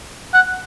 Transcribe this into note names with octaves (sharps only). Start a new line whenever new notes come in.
F#5